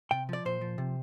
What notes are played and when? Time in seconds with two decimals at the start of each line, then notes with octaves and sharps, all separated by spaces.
0.11 C3 G5
0.29 F3 D5
0.45 A#2 C5
0.61 F3
0.78 C3